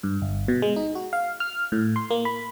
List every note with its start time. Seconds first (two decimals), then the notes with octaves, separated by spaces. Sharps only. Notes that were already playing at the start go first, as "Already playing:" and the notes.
0.03 G2
0.22 G1
0.48 B2
0.62 G#3
0.76 D#4
0.95 F#4
1.13 F5
1.40 F6
1.72 A2
1.96 C6
2.11 A#3
2.25 B5